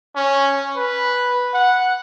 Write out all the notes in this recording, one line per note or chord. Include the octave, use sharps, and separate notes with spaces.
C#4
B4
F#5